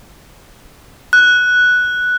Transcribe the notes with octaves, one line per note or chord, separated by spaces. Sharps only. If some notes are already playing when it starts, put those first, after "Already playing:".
F#6